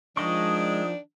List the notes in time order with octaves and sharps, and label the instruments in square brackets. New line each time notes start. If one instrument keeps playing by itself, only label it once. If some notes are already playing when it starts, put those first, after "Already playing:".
[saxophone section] D#3 D4 [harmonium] F3 [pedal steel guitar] G#3 D#5 C#6 [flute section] D#6